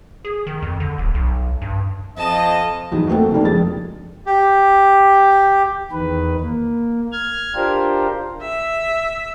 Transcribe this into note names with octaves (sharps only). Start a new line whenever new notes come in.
G#4
D#3
F2
D3
D1
B1
G2
F2 D#5 A5
E2 F#3 D#4
A3 A#3 C4 F#4 A4
D#3 A3 A#3 D4
F1 F2 G#3 A6
G4
E2 D#3 B4
A#3
F6 G#6
D4 F4 G4 A#4 C5
E5